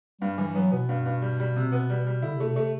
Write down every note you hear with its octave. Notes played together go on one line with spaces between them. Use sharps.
G2 G3
E3 G3
F#3 B3
B2 B3
G2
G2
G3
G3
C3
B3
G3
G3
D3 E4
C3
B2 A3
C3 A3